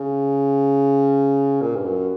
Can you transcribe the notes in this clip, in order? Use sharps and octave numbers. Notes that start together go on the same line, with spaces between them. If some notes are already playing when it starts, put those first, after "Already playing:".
Already playing: C#3
A#2
G2
F#2